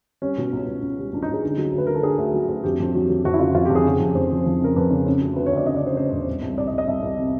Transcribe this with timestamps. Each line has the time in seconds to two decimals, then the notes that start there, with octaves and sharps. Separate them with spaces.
0.22 G3 C#4
0.38 B2
0.53 C#2
0.67 C#2
0.82 C#2
0.98 G3
1.13 C#2 D4
1.22 D#4
1.29 C#2
1.34 G#4
1.44 D3
1.58 F#3
1.73 D2 B4
1.87 F#3 A#4
1.95 A4
2.03 D3 G#4
2.18 D2
2.34 F#3
2.49 D2
2.64 F2 G4
2.80 F2
2.95 F#3
3.10 F#3
3.25 F2 F#4
3.34 E4
3.39 C#3 F4
3.54 F2 F4
3.65 G4
3.70 F2
3.75 G#4
3.85 C#3
4.00 F2
4.15 F2 C5
4.30 F3
4.46 F3
4.61 C#3 A#4
4.76 F2 B4
4.90 C#3
5.06 C#3
5.21 D2
5.36 D2 B4
5.46 C#5
5.52 D2
5.57 D5
5.66 C#3 D#5
5.76 D5
5.81 C#3
5.87 C5
5.97 C#3 C5
6.12 E1
6.27 C2
6.42 C2
6.57 C2 D5
6.68 D#5
6.73 C2
6.78 D#5
6.88 C2 E5
7.02 C2
7.18 C3